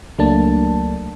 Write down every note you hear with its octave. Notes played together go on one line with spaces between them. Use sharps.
C#2 F#3 A3 A#3 D4 A5